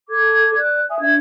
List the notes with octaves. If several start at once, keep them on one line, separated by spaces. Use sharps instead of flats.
A4 D6 G#6
D5 F#6
E5 G#5 D#6
D4 E5 G#6